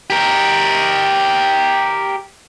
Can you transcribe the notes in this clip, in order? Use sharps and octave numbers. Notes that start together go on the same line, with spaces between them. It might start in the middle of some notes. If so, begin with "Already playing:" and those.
G4 A#4